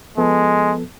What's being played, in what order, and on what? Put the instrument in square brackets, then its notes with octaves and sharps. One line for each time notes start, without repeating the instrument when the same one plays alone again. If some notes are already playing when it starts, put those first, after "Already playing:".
[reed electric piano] F3 B3 A4 [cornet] G#3